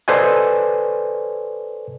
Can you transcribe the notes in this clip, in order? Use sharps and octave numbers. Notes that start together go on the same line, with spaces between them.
A4 B4 C5 D5 D#5 G#5